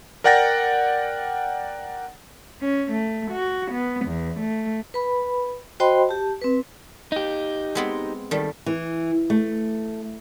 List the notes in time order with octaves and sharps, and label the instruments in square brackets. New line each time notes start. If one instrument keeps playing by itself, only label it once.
[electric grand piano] A#4 D5 F#5 G5 A6 A#6
[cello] C#4
A3
F#4
B3
E2
A3
[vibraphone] B4 B5
F#4 C5 D#5 G5 B5 C6
G4 A5
C4 B4
[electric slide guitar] D#4 G4
[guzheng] G#3 B3 C4
D#3 G3 A3
[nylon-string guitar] E3
A3